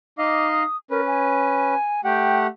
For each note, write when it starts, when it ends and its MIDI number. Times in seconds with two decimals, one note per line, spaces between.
0.18 0.63 63
0.18 0.63 75
0.18 0.63 77
0.18 0.48 86
0.50 0.77 87
0.91 1.75 61
0.91 1.01 70
0.91 1.75 71
1.07 2.01 80
2.04 2.47 57
2.04 2.47 67
2.04 2.47 78
2.04 2.39 79